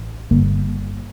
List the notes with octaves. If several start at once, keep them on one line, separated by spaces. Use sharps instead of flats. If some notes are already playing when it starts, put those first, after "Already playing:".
Already playing: A1
G1 G2 D3 A#3